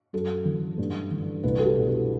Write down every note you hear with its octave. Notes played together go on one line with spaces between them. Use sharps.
F#2 A4
E3
G2
E3
C2 B4
A4
G4
B2
A4